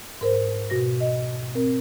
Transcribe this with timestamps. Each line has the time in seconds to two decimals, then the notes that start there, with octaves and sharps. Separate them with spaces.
0.21 G#2 A#4 C5
0.70 B2 F#4 A#6
1.00 D#5
1.55 C4 A#4